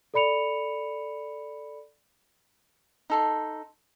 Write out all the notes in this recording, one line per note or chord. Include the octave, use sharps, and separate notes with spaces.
A4 D5 B5 C#7 F7
D#4 A4 C6